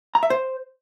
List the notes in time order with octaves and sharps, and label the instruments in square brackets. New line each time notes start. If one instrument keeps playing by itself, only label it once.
[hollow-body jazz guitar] A#5
E5
C5